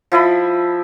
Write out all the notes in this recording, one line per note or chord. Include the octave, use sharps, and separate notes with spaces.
F3 E4 D#5 B5